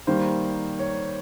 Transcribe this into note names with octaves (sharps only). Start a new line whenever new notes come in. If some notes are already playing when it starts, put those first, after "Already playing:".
D#3 G3 A#3 C5
C#5